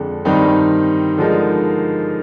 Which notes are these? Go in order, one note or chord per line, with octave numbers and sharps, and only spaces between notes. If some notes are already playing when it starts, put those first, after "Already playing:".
Already playing: F2 D3 G#3
G2 D#3 G3 C4 D#4
D3 F3 G#3 D#4 A#4